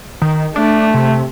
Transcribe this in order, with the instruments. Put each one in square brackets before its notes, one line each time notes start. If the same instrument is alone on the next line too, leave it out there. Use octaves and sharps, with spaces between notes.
[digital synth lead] D#3
[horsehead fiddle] A3 [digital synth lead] D4
[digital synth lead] C3